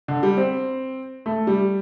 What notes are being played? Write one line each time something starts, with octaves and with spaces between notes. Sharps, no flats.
D3
G3
C4
A3
G3